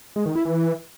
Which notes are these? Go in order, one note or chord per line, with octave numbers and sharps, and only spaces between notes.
G#3
D#3
E4
E3